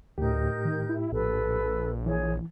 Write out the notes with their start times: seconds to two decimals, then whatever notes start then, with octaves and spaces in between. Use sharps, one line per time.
0.18 D2 A2 D#4 G4 A#4 G6
0.65 D#3
0.89 E4
1.12 A#1 A4 B4
2.06 E3 G#4 C#5